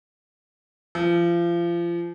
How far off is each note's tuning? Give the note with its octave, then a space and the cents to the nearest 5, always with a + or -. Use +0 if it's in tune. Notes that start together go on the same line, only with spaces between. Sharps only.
F3 -30